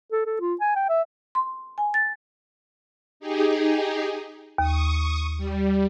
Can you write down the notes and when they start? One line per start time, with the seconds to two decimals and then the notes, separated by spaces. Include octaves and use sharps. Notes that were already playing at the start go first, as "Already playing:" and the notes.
0.12 A4
0.26 A4
0.40 F4
0.60 G#5
0.76 G5
0.89 E5
1.35 C6
1.78 G#5
1.94 A6
3.20 D#4 G4 G#4
4.58 D#2 C#6 D#6
5.38 G3